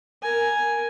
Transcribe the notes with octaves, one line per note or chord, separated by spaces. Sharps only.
A#4 G#5